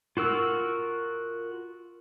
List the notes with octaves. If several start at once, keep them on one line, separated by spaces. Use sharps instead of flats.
F4 F#4 A#4 E6